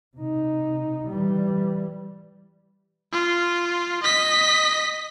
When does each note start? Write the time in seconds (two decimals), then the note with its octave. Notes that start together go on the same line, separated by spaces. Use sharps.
0.17 C3 D#4
1.07 E3 G3
3.12 F4
4.03 D#5 B6